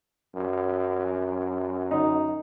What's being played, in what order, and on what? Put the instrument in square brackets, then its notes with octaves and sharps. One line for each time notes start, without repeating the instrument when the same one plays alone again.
[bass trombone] F#2
[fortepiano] D#4